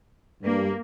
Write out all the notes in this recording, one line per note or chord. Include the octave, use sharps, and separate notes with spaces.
G2 A#3